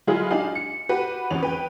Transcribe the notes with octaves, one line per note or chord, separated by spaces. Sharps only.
F#3 G#3 E4 F4 G#4
D4 D#4 G4 F5 G#5
C#7
F#4 G4 B4
G#1 E2 C#4 F7
B4 G5